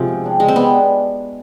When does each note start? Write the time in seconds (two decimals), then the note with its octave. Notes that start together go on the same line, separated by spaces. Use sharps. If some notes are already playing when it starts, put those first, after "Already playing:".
Already playing: G#2 C3 F3 G#3
0.08 B2
0.24 G3 D4 G#4
0.39 B2 G#3
0.48 C4
0.56 G3 B3 D4 G#4